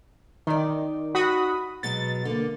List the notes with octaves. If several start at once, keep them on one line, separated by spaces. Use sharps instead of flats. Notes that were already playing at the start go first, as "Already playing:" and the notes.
D#3 D#4 D5
F#4 B5 D#6
B2 F#3 G#3 A6
D3 A#3